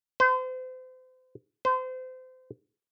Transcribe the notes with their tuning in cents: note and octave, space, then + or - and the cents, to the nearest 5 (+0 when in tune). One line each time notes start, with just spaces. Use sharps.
C5 -35
C5 -30